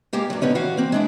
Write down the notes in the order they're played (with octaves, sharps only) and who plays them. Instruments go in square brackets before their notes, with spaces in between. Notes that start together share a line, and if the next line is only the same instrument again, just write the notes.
[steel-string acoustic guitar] G#3 A#3 G4 F5
G2 F#3
A#2 D3 B3 C#4 D#4
E3 F#4 F5
A#3 C4
G#3 D4 E4